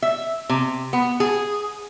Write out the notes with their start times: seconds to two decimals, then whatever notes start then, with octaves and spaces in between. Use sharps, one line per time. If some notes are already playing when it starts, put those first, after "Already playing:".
0.02 E5
0.50 C3
0.93 B3
1.20 G#4